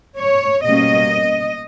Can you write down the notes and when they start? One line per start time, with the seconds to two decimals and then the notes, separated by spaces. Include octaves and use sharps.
0.18 C#5
0.65 B2 G3 A#3 C#4 D#5